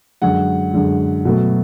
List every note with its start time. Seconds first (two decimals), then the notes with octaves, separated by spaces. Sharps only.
0.22 F#2 D3 G#3 F#5
0.73 F#2 D3 G#3
1.25 B2 F#3 A3